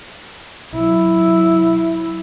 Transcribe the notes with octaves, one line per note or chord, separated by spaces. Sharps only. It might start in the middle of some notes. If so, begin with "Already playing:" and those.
F#3 E4